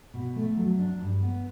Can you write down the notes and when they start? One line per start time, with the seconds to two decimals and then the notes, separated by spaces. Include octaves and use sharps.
0.14 B2
0.36 A3
0.57 F#3
0.79 D4
1.00 G2
1.22 B3